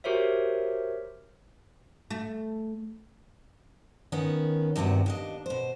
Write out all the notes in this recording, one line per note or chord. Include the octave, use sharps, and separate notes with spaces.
F#4 G4 A#4 C5 C#5 E5
A3
D#3 B3 C#4
E2 G2 C3 D#3 F#4
D#2 D4 D#5
B2 C5